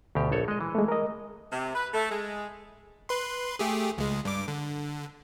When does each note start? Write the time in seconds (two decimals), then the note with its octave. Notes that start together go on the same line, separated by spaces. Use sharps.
0.15 D2 B2 G4
0.32 A#1 A4 C#5
0.48 G#3 D#5
0.61 E3
0.75 G#3 A3
0.88 A#4 D#5
1.52 C3
1.75 B4
1.94 A3
2.10 G#3
3.09 B4 C6
3.59 A3 G4 G#4
3.98 C#2 G#3
4.25 G2 D6
4.48 D3